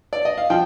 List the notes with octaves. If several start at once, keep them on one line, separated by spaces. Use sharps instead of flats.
D5
D#5
F5
F3 G5